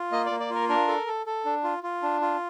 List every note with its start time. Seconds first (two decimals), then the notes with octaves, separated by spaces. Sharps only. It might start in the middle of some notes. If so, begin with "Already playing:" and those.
Already playing: F4
0.12 A#3 D#5
0.26 A#3 D5
0.40 D5
0.50 F4 A#4
0.69 D4 A#4
0.88 A4
1.07 A4
1.26 A4
1.45 D4
1.64 F4
1.83 F4
2.02 D4
2.21 F4